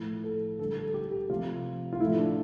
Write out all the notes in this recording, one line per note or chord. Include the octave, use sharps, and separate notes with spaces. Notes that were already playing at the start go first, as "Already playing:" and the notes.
Already playing: A2 F3 A3
A4
D3 G3 A4
A4
G4
G4
C3 F3 A3 F4
F4
A2 F3 A3 E4
D4